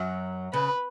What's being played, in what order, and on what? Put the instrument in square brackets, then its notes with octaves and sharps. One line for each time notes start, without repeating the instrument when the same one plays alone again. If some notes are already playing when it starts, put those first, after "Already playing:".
Already playing: [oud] F#2 F#3
[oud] C#3 [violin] B4